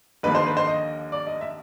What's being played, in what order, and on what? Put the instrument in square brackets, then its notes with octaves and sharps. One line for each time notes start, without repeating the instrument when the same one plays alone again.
[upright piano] D#2 D3 F3 A#3 B4
C5
B4
C5
D#5
D5
D#5
E5